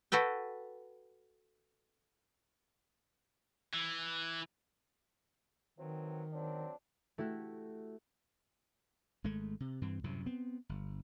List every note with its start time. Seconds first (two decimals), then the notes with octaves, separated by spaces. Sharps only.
0.12 F#4 A4 B4 G5
3.74 E3
5.78 D#3 E3 F#3 C4
6.32 F#3 C4 D4
7.18 A3 E4 F#4 G4
9.24 G#1 G#3 A3
9.60 C3
9.81 G2 E3 C4
10.04 C2 F#2 A2 C3
10.26 B3 C4
10.69 G1